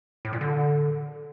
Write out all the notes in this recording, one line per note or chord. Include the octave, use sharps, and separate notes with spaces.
A2
A#2
D3